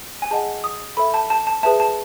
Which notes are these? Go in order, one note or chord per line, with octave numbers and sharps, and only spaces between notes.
G#5
G#4 D#5 F#5 A5
D#6
A4 E5 B5
A5
A5
A5
G#4 B4 E5 A5
A5